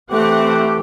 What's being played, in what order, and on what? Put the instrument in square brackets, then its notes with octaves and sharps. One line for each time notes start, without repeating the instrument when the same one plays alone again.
[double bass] E3 [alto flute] A3 [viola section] C4 F#5 [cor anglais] G4